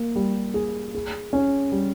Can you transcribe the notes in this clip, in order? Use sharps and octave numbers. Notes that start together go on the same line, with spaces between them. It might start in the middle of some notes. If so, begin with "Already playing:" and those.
Already playing: A#3
G3
G#4
G#4
C#4
G3